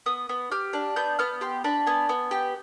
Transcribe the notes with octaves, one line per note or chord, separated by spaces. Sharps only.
B3 D#6
B3
G4 F6
D4
B3 G6
B3 F6
G4 C6
D4 B5
B3 G#5
B3
G4